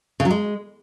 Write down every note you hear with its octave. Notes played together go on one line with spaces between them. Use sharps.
C#3
F#3
G#3